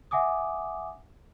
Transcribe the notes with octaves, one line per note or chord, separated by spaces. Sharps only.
E5 F#5 G#5 D6 D#6